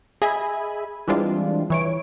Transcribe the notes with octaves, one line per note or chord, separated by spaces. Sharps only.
G#4 D#5 E5 G#5 B5
E3 G3 G#3 C4 D4 F4
E3 C#5 D7